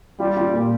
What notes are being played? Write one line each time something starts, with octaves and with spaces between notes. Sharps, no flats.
G3 F4
F4
A#2